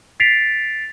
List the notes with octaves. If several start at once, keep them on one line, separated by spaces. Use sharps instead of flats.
A6 B6 C7 D7 F7